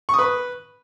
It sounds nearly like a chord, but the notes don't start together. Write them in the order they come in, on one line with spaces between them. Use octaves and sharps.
C#6 D#6 B4